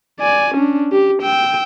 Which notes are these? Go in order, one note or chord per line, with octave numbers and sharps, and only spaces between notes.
D5 G#5
C#4 D4
G4
G5 E6